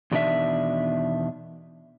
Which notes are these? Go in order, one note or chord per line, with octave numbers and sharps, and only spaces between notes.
E2 B2 D#3 D4 E5